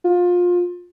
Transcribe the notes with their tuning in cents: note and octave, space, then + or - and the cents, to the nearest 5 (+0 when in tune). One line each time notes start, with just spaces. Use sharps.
F4 +25